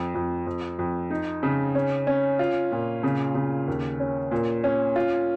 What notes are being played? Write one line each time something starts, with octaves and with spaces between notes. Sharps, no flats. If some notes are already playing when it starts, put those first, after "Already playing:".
Already playing: F2
F2
F2
F2
D#4
C#3
C#4
C#4
F4
A#2
C#3
C#3
D#2
C#4
A#2
C#4
F4